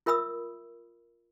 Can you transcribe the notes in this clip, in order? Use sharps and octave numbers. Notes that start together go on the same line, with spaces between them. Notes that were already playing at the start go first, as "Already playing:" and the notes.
F4 A#4 E5 B5 D#6 E6